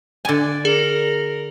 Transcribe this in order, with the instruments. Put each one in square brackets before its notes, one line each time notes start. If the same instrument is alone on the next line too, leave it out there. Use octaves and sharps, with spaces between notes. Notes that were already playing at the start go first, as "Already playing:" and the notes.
[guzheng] D3 G#5 [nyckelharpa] D5
[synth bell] G#4 [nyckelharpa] A#4